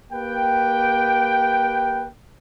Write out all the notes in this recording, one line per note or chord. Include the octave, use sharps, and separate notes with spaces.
A#3 G4 B4 G5